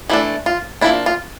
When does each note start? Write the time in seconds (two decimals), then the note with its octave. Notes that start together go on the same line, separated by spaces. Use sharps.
0.10 E3 A3 D4 E4
0.46 F4
0.81 F3 A#3 D4 E4
1.06 F4